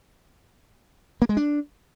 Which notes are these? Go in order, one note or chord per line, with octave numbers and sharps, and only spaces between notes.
A#3
G#3
D4